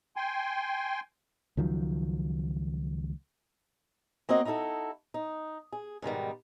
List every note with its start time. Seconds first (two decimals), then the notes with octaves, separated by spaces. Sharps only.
0.16 G5 G#5 C6
1.57 C#2 D#3 F3 F#3
4.29 A#3 C4 F#4 D#5
4.45 D#4 E4 F#4 G#4 A4
5.14 D#4
5.72 G#4
6.02 G#2 B2 D#3 G3